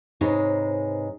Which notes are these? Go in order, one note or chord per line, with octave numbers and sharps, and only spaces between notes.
G#2 C3 G#3 D#4 B4 C#5